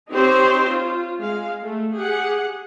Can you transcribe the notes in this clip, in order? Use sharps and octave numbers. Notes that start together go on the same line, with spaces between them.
C4 D#4 G4 C5 C#5
F4
G#3 F5
A3
G4 G#4 F#5